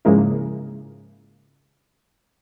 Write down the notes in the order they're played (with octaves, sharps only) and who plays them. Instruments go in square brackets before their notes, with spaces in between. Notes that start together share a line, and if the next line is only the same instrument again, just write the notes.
[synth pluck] G#2 C#3 F3 G#3 A#3 E4